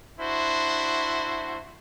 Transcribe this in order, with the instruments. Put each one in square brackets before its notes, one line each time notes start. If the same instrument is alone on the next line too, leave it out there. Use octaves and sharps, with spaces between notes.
[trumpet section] D4 E4 F#4 C5